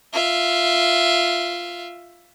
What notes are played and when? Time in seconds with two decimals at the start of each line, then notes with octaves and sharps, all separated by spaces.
0.13 F4 E5